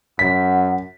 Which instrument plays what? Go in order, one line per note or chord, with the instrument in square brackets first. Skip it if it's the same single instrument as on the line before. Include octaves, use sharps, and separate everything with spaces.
[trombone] F#2 [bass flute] F#5 [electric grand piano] B6